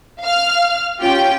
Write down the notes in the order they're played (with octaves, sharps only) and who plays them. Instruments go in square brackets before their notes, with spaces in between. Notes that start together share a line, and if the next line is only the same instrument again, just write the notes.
[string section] F5 F6
C#4 F4 G4 G5